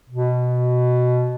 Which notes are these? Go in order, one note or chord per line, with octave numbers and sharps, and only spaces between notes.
B2